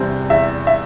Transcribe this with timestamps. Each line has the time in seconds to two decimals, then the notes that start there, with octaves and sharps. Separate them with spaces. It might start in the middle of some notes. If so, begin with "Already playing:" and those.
Already playing: E2 C3 G3 C4
0.30 E2 E5
0.67 E5